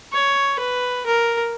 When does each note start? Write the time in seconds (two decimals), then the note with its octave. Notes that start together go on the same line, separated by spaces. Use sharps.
0.12 C#5
0.59 B4
1.06 A#4